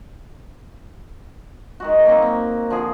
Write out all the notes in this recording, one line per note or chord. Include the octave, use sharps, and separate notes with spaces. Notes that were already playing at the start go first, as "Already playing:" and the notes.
D#3 G#3 F#4
F#3 A#3 C4 C#6
C4
D3 F3 F4 G#4